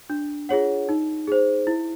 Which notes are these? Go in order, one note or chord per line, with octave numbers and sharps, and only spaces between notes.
D4
F4 G#4 C#5 F#5
D#4
G#4 C5
E4